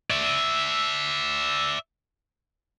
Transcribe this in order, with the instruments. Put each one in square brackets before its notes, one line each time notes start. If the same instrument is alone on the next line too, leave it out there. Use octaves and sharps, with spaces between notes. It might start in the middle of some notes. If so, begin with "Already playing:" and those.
[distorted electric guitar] D5 E5